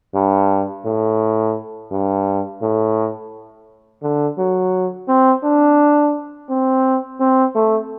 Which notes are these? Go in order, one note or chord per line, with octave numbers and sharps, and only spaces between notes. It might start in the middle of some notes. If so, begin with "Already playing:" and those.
G2
A2
G2
A2
D3
F#3
C4
D4
C4
C4
A3